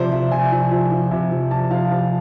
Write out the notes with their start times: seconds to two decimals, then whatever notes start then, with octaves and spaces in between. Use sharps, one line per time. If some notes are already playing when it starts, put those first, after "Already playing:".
Already playing: C3 F3 C5 D5
0.12 F3 E5
0.32 C3 G#5
0.52 F3
0.71 F3
0.92 F3
1.11 C3
1.31 F3
1.51 F3 A5
1.71 F3 F5
1.91 F3 A5